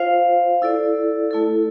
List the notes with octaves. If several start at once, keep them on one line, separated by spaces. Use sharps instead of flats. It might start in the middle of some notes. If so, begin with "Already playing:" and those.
Already playing: F4 C5 F5
E4 A4 D5
A3 E4 A4